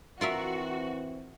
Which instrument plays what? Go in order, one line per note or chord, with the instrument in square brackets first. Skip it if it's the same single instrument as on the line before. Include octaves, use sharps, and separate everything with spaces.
[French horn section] E3 C4 [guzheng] F4 A#4 E5 [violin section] F#4